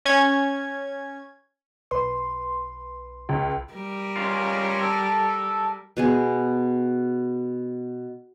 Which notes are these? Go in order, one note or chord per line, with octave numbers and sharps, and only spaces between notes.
C#4 G#6
B1 B4 C6
C#2
G3 A#4
C#4 F4
A4
B2 B3 G#4